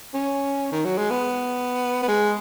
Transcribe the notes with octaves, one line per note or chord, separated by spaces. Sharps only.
C#4
D#3
F#3
G#3
B3
B3
G#3